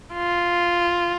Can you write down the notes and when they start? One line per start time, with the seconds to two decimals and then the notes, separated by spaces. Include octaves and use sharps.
0.13 F4